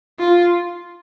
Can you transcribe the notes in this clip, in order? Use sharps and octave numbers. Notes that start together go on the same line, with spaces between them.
F4